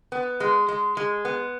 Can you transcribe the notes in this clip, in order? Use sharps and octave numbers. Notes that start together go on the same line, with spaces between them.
B3
G#3
G#3
G#3
B3